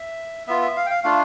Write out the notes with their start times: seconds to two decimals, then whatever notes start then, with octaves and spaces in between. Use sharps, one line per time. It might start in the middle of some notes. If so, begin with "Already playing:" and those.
Already playing: E5
0.47 B3 F4 E5
0.62 E5
0.76 F5
0.86 G5
0.90 F5
1.04 A3 D4 F4 F5